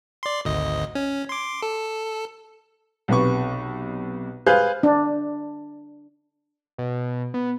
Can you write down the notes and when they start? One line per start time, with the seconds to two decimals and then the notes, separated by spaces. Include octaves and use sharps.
0.23 D5 C6
0.45 G#1 D2 D#5
0.95 C#4
1.29 C6 D6
1.62 A4
3.08 B1 C3 B4 C#6
4.46 G#4 B4 C5 F5 F#6 G6
4.83 D4
6.78 B2
7.34 B3